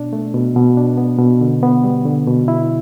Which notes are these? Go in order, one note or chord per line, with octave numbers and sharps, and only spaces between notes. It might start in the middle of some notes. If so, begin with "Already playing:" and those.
Already playing: B2 D4
A3
B2
B2
D4
B3
B2
D3
B3
G3
D3
B2
E4